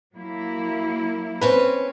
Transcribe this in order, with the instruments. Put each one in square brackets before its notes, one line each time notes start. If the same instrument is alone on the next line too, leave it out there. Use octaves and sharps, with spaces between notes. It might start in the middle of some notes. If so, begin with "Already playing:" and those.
[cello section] F#3 A#3 E4
[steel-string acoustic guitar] C4 C#4 B4